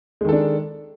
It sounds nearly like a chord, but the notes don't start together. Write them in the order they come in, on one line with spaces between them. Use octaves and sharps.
G#3 D#3 A4 D4